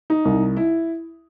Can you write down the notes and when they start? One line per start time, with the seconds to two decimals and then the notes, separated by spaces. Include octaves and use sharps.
0.10 D#4
0.25 C2
0.57 E4